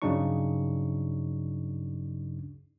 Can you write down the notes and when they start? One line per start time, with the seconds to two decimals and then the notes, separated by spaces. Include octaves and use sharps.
0.02 G2 C#3 F#3 D4 D#4 C#6